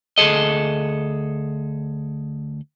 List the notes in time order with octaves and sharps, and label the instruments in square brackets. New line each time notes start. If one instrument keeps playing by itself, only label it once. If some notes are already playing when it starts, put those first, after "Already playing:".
[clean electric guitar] D2 B2 G#4 A4 D#5